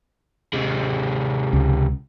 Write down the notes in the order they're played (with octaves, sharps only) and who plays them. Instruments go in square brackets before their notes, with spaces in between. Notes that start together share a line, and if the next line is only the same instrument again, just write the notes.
[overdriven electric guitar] C3 G#3
[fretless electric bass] C#2